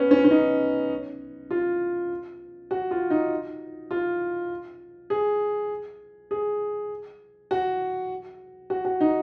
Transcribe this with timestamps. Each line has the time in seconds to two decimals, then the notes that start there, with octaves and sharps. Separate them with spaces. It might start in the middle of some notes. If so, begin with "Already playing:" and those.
Already playing: B3 C#4
0.11 C#4
0.24 C#4
0.31 D#4
1.51 F4
2.71 F#4
2.91 F4
3.10 D#4
3.91 F4
5.10 G#4
6.31 G#4
7.51 F#4
8.70 F#4
8.85 F#4
9.00 D#4